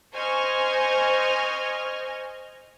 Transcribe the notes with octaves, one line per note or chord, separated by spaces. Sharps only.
C5 D#5 G#5 C#6 F6 G#6